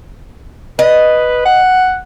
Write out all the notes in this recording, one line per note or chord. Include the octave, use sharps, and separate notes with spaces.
B4 D#5
F#5